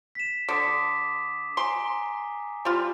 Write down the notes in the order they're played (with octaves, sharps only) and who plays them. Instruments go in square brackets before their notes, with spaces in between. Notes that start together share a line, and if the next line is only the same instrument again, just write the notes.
[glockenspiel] B6 E7
[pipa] D3 [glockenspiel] D6 D#6 B6
[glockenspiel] G#5 A#5 C7 [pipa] C6
[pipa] G3 F4